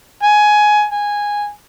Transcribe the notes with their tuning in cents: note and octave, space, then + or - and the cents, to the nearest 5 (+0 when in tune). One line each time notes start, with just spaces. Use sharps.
G#5 +15
G#5 -10